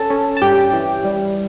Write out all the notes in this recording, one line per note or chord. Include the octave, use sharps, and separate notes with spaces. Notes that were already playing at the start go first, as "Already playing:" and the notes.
Already playing: C#4 A4 A5
C#4
A5
G2 G4 G5
E3
G3